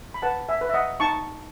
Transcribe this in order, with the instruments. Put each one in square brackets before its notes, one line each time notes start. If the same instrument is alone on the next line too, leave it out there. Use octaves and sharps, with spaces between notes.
[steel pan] B5
B4 F#5 A5
E5 G#5
B4
E5
D#5 F#5
D#4 A5 C#6